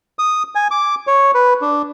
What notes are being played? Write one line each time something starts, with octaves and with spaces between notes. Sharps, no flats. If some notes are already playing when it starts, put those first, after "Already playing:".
D#6
G#5
D6
C#5
B4
D4